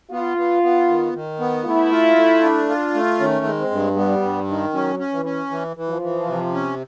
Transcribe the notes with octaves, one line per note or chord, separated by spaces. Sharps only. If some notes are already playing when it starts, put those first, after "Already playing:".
B3 F4
B3
B3
D#3
D#3
B3
A3 E4
F4
A3
D4
F4
A3
D#3 C#4
G#3
C4
G2
G3 B3
G2
D#3
F#3 C#4
C#4
E3
C#4
E3
E3
F3
E3
C3
C#4